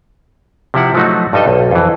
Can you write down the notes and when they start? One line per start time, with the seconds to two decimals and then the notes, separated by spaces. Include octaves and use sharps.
0.74 C3 F3 E4 F#5
0.94 F3 F#3 A3 D#4 F#4
1.33 G2 G3 D#4 A4 D#5
1.48 B1
1.71 F2 E3